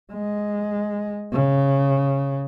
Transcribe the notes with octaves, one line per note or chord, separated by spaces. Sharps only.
G#3
C#3